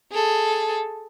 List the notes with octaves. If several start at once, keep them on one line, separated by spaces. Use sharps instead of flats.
G#4 A4